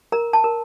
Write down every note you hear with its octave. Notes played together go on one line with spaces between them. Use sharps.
A#4 A#5
A5
A#4